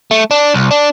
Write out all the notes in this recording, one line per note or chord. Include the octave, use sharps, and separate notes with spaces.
A3
D4
C2
D4